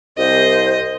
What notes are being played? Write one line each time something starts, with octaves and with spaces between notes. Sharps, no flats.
C2 C5 D#5